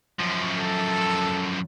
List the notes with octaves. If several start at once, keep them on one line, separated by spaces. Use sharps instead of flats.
F#2 F3
A4